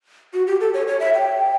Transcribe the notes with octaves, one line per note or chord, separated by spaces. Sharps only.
F#4
G4
A4
C#5
C#5
E5
G5